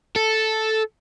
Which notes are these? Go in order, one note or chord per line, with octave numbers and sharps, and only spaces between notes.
A4